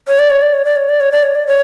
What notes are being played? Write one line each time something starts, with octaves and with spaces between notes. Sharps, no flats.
C#5
D5
C#5
D5
C#5
D5
C#5
D5
C#5
D5
C#5
D5
C#5